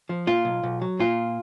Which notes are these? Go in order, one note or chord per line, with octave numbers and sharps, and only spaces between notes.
F3
A#2 F4
B1
B1
F#3
A#2 F4